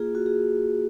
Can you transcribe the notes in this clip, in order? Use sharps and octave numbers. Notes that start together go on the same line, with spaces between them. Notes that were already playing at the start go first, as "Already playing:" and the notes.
Already playing: A#3 F4 G#4
F#4
G#4